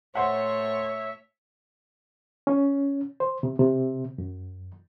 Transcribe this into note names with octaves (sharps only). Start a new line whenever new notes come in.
A2 C5 C#5 E5 F#5
C#4
C5
C3
C3
F#2